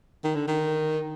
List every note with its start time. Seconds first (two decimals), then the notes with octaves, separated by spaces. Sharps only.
0.24 D#3
0.35 D3
0.48 D#3